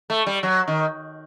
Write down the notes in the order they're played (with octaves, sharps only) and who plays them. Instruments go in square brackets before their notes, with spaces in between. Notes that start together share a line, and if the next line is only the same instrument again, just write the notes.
[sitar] A3
G3
F#3
D#3